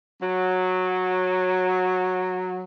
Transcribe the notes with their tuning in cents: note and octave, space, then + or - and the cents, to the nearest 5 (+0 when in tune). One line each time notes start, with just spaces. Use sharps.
F#3 -10